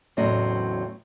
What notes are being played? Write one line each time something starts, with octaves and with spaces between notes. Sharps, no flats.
E2 A2 C#3 F#3 C4 D#5